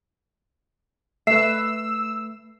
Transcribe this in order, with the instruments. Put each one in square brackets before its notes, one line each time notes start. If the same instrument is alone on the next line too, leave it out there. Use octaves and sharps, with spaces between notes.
[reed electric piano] A3 [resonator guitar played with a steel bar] B4 E5 [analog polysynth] E6 [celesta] C7